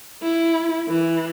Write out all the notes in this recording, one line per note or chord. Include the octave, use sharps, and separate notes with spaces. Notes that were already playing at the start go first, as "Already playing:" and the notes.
E4
E3